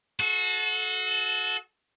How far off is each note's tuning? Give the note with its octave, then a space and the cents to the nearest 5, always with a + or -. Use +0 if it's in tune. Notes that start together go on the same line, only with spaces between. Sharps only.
F#4 -15 A4 -30